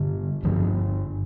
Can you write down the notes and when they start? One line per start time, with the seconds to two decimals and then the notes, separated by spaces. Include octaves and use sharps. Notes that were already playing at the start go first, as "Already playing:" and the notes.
Already playing: G2 D3
0.43 G2 D3 F3 A3